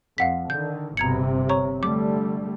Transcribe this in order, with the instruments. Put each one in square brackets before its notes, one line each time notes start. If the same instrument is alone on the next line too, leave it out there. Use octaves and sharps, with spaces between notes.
[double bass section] F2 [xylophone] F5 F#5 B6
[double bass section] D3 D#3 [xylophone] G6
[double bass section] G1 C3 [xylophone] A#5 G#6 C#7
[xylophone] C#5 A#5 C#6
[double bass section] D3 G3 A3 [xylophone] D6